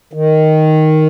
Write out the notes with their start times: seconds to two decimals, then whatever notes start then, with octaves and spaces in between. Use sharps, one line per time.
0.13 D#3